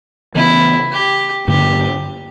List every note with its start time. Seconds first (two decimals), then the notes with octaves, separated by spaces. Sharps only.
0.35 C#3 E3 B3 E4
0.92 G4
1.47 G2 D3 A#3 G4